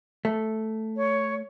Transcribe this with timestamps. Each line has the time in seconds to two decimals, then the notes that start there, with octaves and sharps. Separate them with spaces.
0.25 A3
0.96 C#5